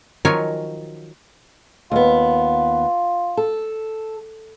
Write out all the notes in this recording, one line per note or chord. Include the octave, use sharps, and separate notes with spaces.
D#3 F3 F#3 A#4 C#5 G#5
D#2 B3 F4
A4